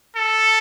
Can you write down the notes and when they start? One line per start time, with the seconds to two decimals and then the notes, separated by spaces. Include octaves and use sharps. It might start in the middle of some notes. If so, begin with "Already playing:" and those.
0.16 A4